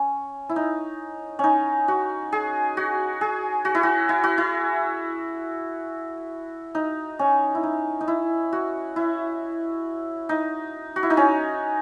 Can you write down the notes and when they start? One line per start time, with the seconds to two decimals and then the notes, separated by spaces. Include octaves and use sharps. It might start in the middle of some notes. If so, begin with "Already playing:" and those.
Already playing: C#4
0.49 E4
0.56 D#4
1.39 C#4 D#4
1.88 F#4
2.32 G#4
2.77 F#4
3.21 G#4
3.65 F#4
3.75 E4
3.83 F#4
4.09 E4
4.24 F#4
4.38 E4
6.75 D#4
7.19 C#4
7.55 E4
7.63 D#4
8.01 D#4
8.08 E4
8.53 F#4
8.96 E4
10.29 D#4
10.96 F#4
11.03 E4
11.10 D#4
11.17 C#4